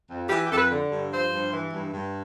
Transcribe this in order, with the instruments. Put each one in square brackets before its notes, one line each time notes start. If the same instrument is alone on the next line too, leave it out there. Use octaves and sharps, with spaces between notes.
[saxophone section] F2
E3 G4
G4
F2 A4
B4
D3
G2
F3 C5
G2
E3
G2
G2